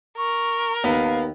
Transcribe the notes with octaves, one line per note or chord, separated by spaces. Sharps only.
A#4 C#6
D#2 B3 F5